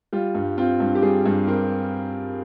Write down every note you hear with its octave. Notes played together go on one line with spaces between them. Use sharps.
G3 F4
G2
C4 F4
G2
G4
G3 G#4
G2
C4 A#4